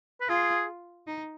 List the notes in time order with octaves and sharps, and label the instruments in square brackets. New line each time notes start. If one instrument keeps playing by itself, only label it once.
[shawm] B4
[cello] F4 [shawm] G#4
[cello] D#4